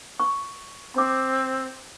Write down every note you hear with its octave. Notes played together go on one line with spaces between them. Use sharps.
C#6
C4 C6 D6